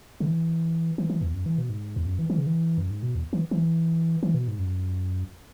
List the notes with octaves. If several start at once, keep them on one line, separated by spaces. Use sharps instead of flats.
C#3
E3
E3
E3
E2
F#2
E3
B2
G#2
E2
F#2
E3
E3
C#3
E3
F#2
G#2
B2
E2
E3
E3
E3
B2
G#2
F#2